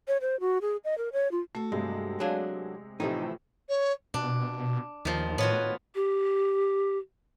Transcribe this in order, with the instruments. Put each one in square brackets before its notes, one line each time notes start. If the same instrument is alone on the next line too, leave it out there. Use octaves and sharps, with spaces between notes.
[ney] C#5
C5
F#4
G#4
D#5
A#4
C#5
F4
[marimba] A3 [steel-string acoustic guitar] F#4 A4
[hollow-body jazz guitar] G2 [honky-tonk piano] C3 G#3
[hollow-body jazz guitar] F#3 D4 G#4 [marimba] D5 F5 A5
[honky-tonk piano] A2 C3 [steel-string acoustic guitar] E3 F3 A3 [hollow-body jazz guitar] D#4
[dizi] C#5
[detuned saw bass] B2 [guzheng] D4
[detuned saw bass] D#2 [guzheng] D#3 F3
[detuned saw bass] A2 [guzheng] B3 F4 F#4 [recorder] C#5
[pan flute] G4